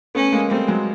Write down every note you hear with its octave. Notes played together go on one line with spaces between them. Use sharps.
A3 B3 C#4
G#3 A#3
G3 A3 C4
F#3 G#3